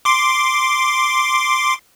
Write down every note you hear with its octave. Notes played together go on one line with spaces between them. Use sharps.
C6 D6